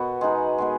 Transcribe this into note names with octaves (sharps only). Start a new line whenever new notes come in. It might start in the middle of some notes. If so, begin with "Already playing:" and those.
Already playing: B2 B3 F#4
G#3 D#4 G#4
G#3 B3 G#4